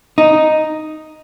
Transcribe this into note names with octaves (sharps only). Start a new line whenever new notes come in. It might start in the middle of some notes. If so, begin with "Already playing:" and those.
D#4